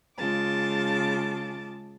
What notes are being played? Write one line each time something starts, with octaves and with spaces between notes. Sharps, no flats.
C#3 G#3 F4 A5 D6